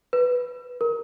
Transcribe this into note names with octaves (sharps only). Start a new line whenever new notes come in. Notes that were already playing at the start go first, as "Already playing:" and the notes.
B4
A#4